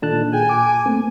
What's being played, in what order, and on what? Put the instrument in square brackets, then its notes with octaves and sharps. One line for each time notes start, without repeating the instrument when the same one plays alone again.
[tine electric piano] A#2 A5 F#6 [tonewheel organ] D#3 D4 A4
[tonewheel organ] G#4 G5 [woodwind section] G#5
[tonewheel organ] D6
A3 A#3 C4